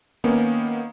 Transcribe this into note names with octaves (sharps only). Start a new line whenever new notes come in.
D#3 A#3 B3 C#4